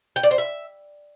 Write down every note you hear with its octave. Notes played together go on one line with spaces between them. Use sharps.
G5
D5
C5
E5